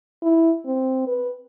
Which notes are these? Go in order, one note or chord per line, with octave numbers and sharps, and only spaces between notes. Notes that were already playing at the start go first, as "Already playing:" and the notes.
E4
C4
B4